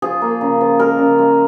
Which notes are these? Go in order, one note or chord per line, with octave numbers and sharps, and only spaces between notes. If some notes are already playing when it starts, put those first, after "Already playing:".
F3 G#4
A#3
C#3
F3
G#3 A#4
C#3
G#3